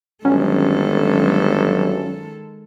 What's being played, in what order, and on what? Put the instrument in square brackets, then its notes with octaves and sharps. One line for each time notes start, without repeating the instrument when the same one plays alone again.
[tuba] G1 [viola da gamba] D#3 G#3 A4 [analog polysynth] F#3 C#4